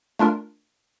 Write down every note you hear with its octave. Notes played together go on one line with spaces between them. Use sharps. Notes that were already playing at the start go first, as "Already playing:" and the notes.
A3 D4 F4 A#4